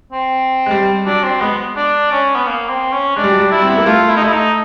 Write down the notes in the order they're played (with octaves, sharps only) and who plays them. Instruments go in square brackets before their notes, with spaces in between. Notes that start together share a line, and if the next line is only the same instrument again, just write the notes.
[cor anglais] C4
[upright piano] G#3
G3
[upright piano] F#3 [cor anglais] D4
[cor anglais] C4
[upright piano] G#3 [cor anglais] B3
[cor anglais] D4
C#4
B3
A#3
C4
C#4
[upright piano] G#3 [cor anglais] D4
[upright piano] G3
F#3
G3
[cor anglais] E4
[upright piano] C4
B3
A#3
[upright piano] A3 [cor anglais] F4
[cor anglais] E4
D#4
[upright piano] A3 [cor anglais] E4
[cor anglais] D#4